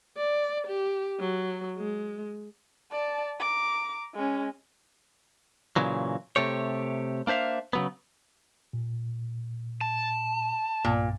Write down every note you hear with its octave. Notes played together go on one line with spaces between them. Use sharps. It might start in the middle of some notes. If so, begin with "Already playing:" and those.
D5
G4
F#3
G#3
D5 A5
A#5 D6
G#3 C#4
A#2 C#3 E3 F#3
C3 A3 G4 C#5
A#3 D4 C5 E5 F5
C#3 F#3 B3
A#2
A5
B1 G2 A#2